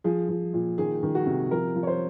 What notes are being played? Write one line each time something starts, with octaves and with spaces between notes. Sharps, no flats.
F3 G#4
F3
A#2
D#3 G#4
D#3
F#4
C3
F3 A#4
F3
C#5
C5